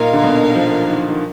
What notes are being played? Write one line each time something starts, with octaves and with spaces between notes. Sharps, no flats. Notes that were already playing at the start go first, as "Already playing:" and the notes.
Already playing: A#2 D#4 A#4 F5
D3
B2
F3
D#3
D#3